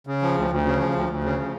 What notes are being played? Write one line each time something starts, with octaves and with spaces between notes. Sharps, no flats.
C#3
F3
D2
D2
C#3
F3
D2
D2
C#3
F3